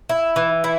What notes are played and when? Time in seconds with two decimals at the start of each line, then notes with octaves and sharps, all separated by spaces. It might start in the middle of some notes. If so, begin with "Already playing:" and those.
0.09 E4
0.36 E3
0.64 E4